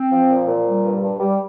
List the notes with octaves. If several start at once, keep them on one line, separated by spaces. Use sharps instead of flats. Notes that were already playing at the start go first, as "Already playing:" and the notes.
Already playing: C4
F3
A#2
A#2
G3
G2
G2
G3